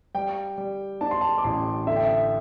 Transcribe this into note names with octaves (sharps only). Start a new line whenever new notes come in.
G3 G5
G3
D4 A5
C6
A5
D6
A1 C6
D3 E5
G5
E5